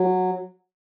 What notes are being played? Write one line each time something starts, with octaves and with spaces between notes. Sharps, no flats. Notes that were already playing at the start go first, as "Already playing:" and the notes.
Already playing: F#3